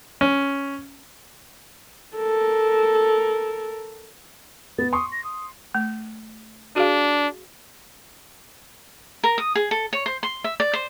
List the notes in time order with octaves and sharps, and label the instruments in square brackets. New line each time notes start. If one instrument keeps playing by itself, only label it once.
[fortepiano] C#4
[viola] A4 A#4
[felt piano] B3 [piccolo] A6
[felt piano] C6 C#6 [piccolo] D#6
[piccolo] A#6
D#6
[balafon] A3
[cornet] D4 [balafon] F#4 G#4 F5
[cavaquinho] A#4
D#6
G#4
A4
C#5
C5
C6
E5
D5
C5